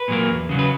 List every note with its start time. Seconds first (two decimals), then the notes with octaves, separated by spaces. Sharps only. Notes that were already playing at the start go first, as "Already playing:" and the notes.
Already playing: B4
0.08 A#2 F#3 A#3
0.29 E2
0.49 C#3 F#3
0.59 B4